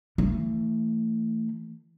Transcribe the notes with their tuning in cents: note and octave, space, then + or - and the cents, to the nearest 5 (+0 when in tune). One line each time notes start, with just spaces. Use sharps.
E3 +0 A3 +25